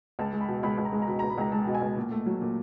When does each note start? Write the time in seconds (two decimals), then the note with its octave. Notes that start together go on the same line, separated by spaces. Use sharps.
0.19 C#2 A5
0.33 G#3
0.41 B5
0.48 B2
0.63 C#2 B5
0.78 C#2
0.85 A#5
0.93 G#3
1.02 A#5
1.08 B2 B5
1.19 C#2 A#5
1.30 B5
1.38 C#2 A#5
1.52 G#3 A5
1.67 B2
1.75 G#5
1.81 C#2
1.97 A#2
2.11 A3
2.26 F#3
2.42 A#2